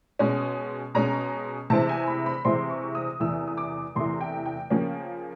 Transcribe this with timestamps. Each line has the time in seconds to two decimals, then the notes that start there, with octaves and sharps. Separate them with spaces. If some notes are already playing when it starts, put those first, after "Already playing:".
0.19 B2 G#3 C#4
0.94 B2 G#3 C#4 A#5
1.70 C3 E3 G#3 C4 E4 A5
1.89 G#5
2.07 B5
2.26 B5
2.45 C3 E3 G#3 C4 E4 C6
2.70 C#6
2.95 D#6
3.20 E2 C3 E3 A3 E6
3.47 D#6
3.57 D6
3.95 E2 C3 E3 A3 C6
4.21 G5
4.46 G5
4.70 C#3 F3 A#3 C#4